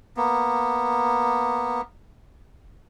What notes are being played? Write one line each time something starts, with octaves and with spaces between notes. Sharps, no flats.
A#3 B3